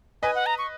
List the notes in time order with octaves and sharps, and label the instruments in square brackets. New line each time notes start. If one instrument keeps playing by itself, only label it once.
[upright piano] B4 D#5 [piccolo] G#5
[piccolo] F#5
A#5
C#6